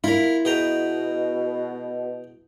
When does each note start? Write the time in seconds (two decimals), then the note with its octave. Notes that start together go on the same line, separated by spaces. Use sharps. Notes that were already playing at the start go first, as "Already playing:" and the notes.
0.04 E4 F4 A#4
0.45 B2 G#4 G5 A#5